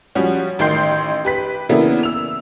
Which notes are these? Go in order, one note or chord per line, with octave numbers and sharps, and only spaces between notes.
F3 G3 C#4 F#4
A1 D#3 G5 C6 G6 C7
G4 B4 B6
C#3 E3 A#3 B3 D4 E4
E6 F7